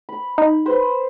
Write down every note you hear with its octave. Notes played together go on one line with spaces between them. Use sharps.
B5
D#4
B4 C5 B5